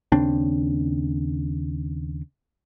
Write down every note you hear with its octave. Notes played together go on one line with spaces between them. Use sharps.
D#2 C#3 C4 D4